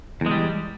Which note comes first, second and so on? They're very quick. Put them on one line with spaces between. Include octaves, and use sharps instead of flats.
E2 G#3 G3